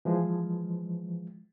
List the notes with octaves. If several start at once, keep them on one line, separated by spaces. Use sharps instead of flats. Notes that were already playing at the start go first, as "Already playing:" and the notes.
E3 F3 G#3